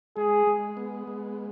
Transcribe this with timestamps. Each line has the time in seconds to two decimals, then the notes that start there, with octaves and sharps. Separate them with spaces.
0.16 G#3 G#4
0.47 G#3
0.77 B3
1.07 G#3